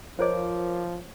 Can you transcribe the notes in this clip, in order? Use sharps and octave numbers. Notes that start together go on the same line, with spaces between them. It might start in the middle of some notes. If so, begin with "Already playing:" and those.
F3 F4 A#4 C5 C#5 D#5 D6